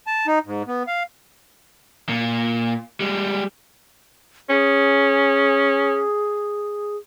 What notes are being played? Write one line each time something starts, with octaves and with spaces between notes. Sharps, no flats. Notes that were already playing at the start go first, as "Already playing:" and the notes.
A5
D#4
G#2
B3
F5
A#2
G3 G#3
C#4 G#4